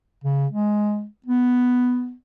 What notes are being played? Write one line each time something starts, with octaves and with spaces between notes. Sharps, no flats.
C#3
G#3
B3